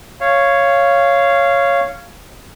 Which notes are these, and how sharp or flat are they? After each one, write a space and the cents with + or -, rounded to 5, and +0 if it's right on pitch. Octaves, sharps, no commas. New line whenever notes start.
C#5 +0 F5 -15